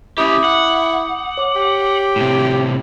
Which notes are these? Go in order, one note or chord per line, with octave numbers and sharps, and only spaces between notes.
C#4 E4 G4 D6 D#6 G6
F#5
C#5 D6
G4
A2 C3